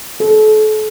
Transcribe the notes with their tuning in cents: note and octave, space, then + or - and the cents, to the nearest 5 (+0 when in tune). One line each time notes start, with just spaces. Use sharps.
A4 -35